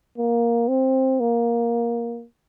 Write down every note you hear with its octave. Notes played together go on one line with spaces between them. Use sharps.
A#3
C4
A#3